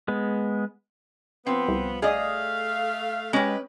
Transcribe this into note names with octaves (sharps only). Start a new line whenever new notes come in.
G#3 B3
F3 B3 C4
C2
A3 G#4 D5 D#5 F5
G#3 C#4 G4 B4